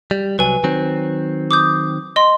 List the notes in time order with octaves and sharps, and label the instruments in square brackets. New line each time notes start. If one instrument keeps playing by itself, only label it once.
[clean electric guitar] G3
[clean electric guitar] C2 F#3 [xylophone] B4 G#5
[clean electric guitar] D#3 F#3 C4
[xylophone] D6 D#6 G6
D#5 C6